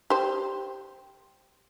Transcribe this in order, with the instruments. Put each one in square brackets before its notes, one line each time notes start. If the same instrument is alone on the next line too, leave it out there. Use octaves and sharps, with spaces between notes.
[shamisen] G4 C5